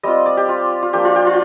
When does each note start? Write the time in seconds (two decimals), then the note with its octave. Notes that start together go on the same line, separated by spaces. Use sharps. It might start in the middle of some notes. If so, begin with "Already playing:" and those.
0.03 G3 C4 F4 D#5
0.26 D5
0.37 G4
0.49 F4
0.83 F4
0.93 F3 A#3 D4 F4 G4
1.05 F4
1.15 G4
1.27 F4